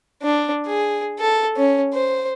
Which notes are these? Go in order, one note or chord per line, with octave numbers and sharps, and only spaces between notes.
D4
G#4
A4
C#4
C5